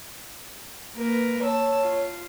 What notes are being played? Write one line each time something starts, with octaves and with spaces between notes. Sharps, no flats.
A#3 A#4 B4
C#5 A5 E6
F4